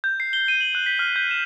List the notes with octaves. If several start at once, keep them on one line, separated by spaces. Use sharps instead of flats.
G6
C7
G7
D#7
F#7
F#6
B6
F6
G6
E7